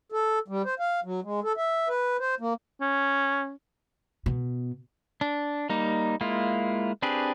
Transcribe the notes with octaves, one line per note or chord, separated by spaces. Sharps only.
A4
G3
C5
F5
F#3
G#3
A4
E5
B4
C5
A#3
C#4
B2
D4
G3 A#3 D#4
G#3 A#3 E4 F4
C4 D4 G4 G#4 B4